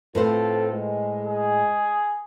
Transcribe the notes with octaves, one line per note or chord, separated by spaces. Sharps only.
A2 C4 F4 A4 B4 C5
G#3
G#4